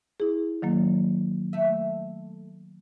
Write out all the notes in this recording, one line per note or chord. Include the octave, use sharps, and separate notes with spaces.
E4 G#4
D#3 F#3 A#3
A3 E5